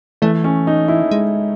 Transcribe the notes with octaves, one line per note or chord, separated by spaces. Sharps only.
E3 A3
C#4
D#4
E4
G#3